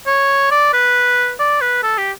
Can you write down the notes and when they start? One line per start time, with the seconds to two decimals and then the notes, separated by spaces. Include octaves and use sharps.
0.07 C#5
0.51 D5
0.73 B4
1.39 D5
1.61 B4
1.83 A4
1.98 G4